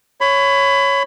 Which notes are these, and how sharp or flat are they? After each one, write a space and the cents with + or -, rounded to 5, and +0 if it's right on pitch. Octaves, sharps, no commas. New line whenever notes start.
C#5 +0 B5 +25